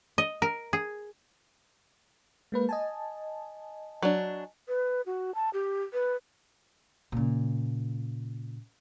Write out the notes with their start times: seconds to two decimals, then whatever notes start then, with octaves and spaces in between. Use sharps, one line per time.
0.18 D#5
0.42 A#4
0.73 G#4
2.52 G#3 A#3 B4
2.69 D#5 G#5 A5
4.02 F#3 D4
4.68 B4
5.06 F#4
5.35 A5
5.53 G4
5.93 B4
7.12 A#2 C#3